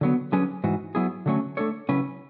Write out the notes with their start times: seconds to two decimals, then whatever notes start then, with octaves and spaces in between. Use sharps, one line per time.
0.01 D3 F#3 B3
0.32 D3 F#3 C#4 G#4 B4
0.64 G#2 E3 F#4
0.95 F#3 B3 E4 G#4
1.26 D3 F#3 A3 C#4
1.57 A3 D4 A4 C#5
1.89 C#3 F#3 C#4 E4 B4